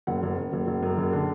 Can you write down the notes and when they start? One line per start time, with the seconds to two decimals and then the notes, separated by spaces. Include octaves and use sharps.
0.07 F#1 F#5
0.23 F#1
0.37 F#1
0.53 F#1
0.67 F#1
0.83 F#2
0.98 F#1
1.13 D3